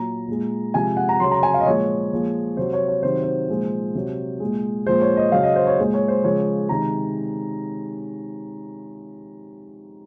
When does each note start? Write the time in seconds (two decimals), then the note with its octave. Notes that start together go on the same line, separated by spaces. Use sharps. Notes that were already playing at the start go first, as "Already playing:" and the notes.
Already playing: A#2 F#3 A#5
0.28 A#2 G#3
0.74 C3 F3 G#3 G#5
0.97 F#5
1.09 A#5
1.20 C#3 F#3 C6
1.31 A#5
1.43 G#5
1.54 F5
1.60 D#5
1.66 A#2 F3 G#3 C#5
2.12 A#2 F3 G#3
2.57 C3 F#3 C5
2.73 C#5
2.88 C#5
3.03 C3 D#3 F#3 C5
3.23 C5
3.49 A#2 F3 G#3
3.95 C3 F#3
4.40 A#2 G#3
4.86 A#2 F3 G#3 C5
5.01 C#5
5.17 D#5
5.32 C#3 F#3 F5
5.43 D#5
5.56 C5
5.67 C#5
5.79 A#2 G#3
5.94 C#5
6.08 C5
6.24 C#3 F3 G#3 C#5
6.69 C3 D#3 G#3 A#5